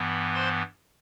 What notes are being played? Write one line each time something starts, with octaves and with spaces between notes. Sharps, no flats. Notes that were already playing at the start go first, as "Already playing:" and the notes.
Already playing: G2 E3 B3
C5 C6